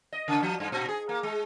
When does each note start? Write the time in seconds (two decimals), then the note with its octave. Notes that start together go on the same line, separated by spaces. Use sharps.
0.12 D#5
0.28 C#3
0.43 F3
0.60 G2
0.72 A#2
0.88 G#4
1.09 A#3
1.23 G#3